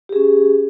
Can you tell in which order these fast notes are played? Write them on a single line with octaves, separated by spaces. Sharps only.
G4 G#4 C#4